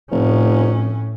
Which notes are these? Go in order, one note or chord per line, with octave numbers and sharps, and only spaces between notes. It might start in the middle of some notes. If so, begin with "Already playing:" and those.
F1 A2 C#4